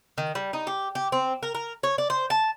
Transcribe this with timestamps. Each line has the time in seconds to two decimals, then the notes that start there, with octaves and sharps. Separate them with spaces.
0.18 D#3
0.35 G3
0.53 D#4
0.67 G4
0.95 G4
1.12 C4
1.43 A#4
1.55 A#4
1.83 C#5
1.98 D5
2.10 C5
2.30 A5